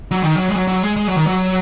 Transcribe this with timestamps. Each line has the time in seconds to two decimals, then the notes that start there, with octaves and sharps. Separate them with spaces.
0.11 F#3
0.24 D#3
0.37 F#3
0.48 G#3
0.54 F#3
0.68 F#3
0.83 G#3
0.97 G#3
1.07 F#3
1.17 D#3
1.27 F#3